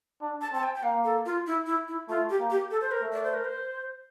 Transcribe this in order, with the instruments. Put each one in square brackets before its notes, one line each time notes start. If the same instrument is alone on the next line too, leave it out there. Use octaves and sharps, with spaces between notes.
[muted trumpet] D4
[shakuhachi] A5
[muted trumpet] C4 [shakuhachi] A5
[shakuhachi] G5
G5
[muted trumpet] A#3 [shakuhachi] F5
[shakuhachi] A4
F4
E4
E4
E4
[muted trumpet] A3 [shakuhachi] F4
[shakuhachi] G4
[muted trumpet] A#3
[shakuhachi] G4
A4
C5
A#4
[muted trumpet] A3
[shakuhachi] D5
C5
A#4
C5